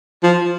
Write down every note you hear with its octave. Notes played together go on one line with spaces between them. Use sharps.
F3